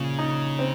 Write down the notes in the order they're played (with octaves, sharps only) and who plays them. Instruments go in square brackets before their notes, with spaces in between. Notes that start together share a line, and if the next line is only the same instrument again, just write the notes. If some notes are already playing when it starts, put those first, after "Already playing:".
Already playing: [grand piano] A#2 F3 [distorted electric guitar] C#3
[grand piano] D#4
C4